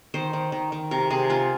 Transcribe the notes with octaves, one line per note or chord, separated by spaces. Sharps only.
D#3 C5
D#3
D#3
D#3
C3 A#4
C3 G#4
G#3 F4